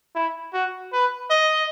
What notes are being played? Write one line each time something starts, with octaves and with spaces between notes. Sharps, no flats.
E4
F#4
B4
D#5